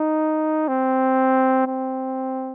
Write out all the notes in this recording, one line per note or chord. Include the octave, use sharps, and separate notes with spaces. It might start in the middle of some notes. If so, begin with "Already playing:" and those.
Already playing: D#4
C4
C4